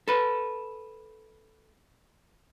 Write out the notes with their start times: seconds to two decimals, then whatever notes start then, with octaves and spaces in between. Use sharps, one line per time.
0.08 A4 B4